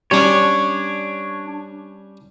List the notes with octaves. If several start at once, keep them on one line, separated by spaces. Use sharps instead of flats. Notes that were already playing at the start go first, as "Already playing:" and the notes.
G3 C#4 D4 C#5